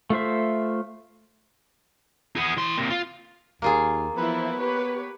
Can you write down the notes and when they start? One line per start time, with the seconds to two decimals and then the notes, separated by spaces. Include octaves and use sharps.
0.10 A3 F4 C5 E5
2.36 B3 G#4
2.57 E3 C6
2.78 C3 A#3
2.90 F4
3.62 D#2 A#3 F4 G#4
4.18 E3 F3 B3 E4
4.61 G4 B4 C#5